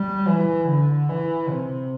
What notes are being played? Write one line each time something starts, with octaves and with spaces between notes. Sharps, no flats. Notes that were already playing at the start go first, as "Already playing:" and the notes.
Already playing: G3
E3
D3
E3
C3